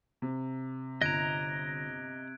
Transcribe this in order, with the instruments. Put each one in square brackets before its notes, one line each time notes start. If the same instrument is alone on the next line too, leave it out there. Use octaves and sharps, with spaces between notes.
[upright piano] C3
[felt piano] G1 [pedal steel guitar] D#5 A#5 [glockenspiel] F#6 G#6 D7